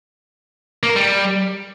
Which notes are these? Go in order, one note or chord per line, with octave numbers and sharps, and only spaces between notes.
A#3
A#4
G3